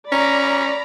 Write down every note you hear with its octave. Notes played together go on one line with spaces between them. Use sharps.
C#4 D5 A#5 B5